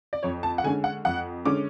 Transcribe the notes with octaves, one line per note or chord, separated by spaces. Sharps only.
D5
F2 C#5
A5
F#5
D3 G#3 C#4 G#5
F#5
F2 F#5
D3 G#3 C#4 D6